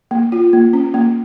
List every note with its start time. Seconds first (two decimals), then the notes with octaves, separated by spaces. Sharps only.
0.11 A#3
0.32 F4
0.53 A#3
0.73 C#4
0.94 A#3